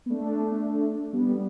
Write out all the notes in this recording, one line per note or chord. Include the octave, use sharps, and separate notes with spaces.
B3
A3 D4
G3 B3